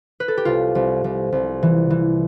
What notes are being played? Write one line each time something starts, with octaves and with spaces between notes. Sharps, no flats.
B4
A4
G4
C2 F4
C2
C2
C2
E3
E3